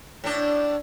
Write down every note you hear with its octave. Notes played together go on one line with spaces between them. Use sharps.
A2 D4